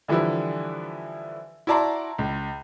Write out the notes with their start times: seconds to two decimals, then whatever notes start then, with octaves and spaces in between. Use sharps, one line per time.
0.08 D3 E3 F3 G3 E4
1.67 E4 F#4 D5 A5 A#5 C6
2.19 C#2